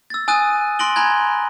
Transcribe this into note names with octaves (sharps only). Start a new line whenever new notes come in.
E6 A6
G#5 D#6 F#6 A6 D#7
C6 F#6 A#6 D7 F#7 G7
G#5 A#5 B5 F#6 G#6